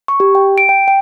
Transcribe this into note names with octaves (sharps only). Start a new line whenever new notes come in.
C#6
G4
G5
D7
G5
G5